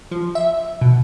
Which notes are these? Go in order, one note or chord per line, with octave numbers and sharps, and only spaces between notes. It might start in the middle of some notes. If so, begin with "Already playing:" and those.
F3
E5
B2